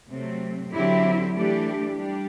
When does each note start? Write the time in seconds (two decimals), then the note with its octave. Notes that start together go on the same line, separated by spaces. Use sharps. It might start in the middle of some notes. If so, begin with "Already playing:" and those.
0.10 C3 F#3 A3 C4
0.72 D3 F#3 C4 E4 G4
1.34 E3 A3 D4 G4
1.96 G3 D4 G4